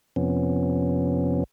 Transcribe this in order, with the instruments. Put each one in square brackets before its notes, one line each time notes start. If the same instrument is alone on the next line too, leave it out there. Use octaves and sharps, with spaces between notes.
[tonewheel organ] F2 C3 F3 B3 C#4